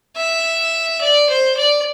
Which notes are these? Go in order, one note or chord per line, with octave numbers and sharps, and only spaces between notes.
E5
D5
C5
D5